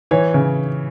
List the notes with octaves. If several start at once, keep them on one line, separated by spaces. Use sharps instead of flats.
E3 C#5
C#3